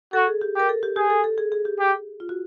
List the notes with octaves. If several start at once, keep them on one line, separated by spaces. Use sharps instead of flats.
F#4 A4
G#4
G4
G4 A#4
A4
G4
G4 G#4
A4
A4
G#4
G#4
G4
G4
F4
F#4